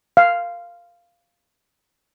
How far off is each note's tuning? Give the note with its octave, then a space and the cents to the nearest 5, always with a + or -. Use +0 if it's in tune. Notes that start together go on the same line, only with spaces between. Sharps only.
F5 -5